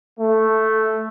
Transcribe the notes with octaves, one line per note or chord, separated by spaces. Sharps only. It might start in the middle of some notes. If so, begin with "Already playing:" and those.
A3